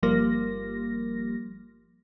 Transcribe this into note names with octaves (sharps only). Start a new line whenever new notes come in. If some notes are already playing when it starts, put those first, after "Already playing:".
G1 F3 G3 A#3 A#6